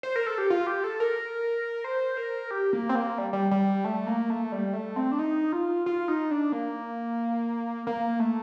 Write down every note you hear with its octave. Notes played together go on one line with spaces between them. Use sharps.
C5
A#4
A4
G4
F4
G4
A4
A#4
C5
A#4
G4
A#3
C4
A#3
G3
G3
G3
A3
A#3
A3
G3
A3
C4
D4
D#4
F4
F4
D#4
D4
A#3
A#3
A3